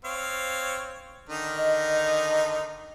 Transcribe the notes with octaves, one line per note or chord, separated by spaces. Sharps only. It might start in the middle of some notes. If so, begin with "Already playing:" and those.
C4 C#5 F5
D3 D#3 D#4
D#5